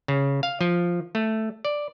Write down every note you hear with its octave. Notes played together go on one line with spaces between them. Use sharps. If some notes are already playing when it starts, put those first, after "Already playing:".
C#3
F5
F3
A3
D5